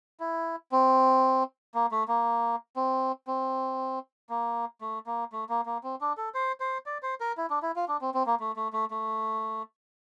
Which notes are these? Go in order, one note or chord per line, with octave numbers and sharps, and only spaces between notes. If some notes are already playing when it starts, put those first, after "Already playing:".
E4
C4
A#3
A3
A#3
C4
C4
A#3
A3
A#3
A3
A#3
A#3
C4
D4
A4
C5
C5
D5
C5
A#4
E4
D4
E4
F4
D4
C4
C4
A#3
A3
A3
A3
A3